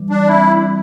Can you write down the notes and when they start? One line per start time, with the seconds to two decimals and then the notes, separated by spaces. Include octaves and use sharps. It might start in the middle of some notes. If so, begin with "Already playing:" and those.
Already playing: E3 G3
0.10 D4
0.27 C4 E4